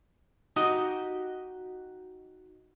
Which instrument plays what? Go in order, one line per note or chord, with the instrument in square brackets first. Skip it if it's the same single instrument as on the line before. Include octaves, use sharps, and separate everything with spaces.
[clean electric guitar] D#4 F#4 G4 D#5